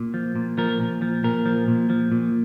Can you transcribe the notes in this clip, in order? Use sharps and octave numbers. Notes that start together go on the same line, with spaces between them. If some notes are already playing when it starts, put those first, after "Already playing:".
Already playing: A#2
F3
A#2
F3 A#4
A#2
F3
A#2 A#4
F3
A#2
F3
A#2